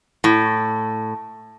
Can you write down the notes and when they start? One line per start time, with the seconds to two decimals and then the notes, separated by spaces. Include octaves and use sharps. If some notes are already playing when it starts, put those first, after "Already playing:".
0.24 A2